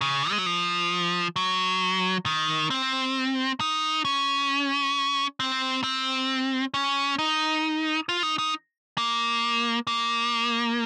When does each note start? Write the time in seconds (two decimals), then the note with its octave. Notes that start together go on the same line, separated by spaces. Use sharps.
0.01 C#3
0.31 G#3
0.38 F#3
0.46 F3
1.36 F#3
2.26 D#3
2.70 C4
3.60 D#4
4.05 C#4
5.40 C4
5.84 C4
6.74 C#4
7.19 D#4
8.09 F4
8.23 D#4
8.38 D#4
8.98 A#3
9.87 A#3